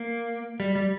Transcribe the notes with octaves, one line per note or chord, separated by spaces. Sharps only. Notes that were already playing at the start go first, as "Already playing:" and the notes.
Already playing: A#3
G3
G3